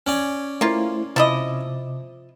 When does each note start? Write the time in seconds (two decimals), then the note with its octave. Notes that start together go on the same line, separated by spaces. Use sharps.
0.07 C#4 D5 G#5
0.61 A3 A#3 E4 F4 C5
1.16 C3 F3 E4 D#5 D6